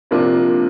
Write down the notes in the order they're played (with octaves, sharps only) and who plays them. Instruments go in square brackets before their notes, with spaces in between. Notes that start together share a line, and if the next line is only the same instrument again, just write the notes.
[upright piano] C3 F3 A#3 D4 F4